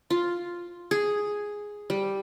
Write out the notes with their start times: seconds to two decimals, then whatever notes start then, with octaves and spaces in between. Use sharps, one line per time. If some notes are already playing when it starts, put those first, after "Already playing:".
0.10 F4
0.91 G#4
1.90 G3